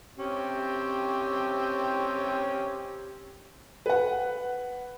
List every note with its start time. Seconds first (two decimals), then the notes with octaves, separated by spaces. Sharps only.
0.18 C4 C#4 G4
3.86 B4 F#5